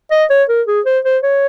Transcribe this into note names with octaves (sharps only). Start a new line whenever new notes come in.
D#5
C#5
A#4
G#4
C5
C5
C#5